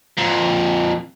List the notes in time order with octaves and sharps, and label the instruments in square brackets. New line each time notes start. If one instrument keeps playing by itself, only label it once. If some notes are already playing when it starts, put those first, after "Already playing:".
[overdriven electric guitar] F2 A#2